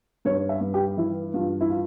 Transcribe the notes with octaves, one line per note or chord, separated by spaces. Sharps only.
G2 C#5
E5
G2
G4
E3 E4
G2 F4
E4
F4